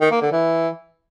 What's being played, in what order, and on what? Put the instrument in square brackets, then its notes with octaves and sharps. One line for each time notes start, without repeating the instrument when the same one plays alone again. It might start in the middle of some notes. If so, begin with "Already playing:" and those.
[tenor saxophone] D#3
A#3
D3
E3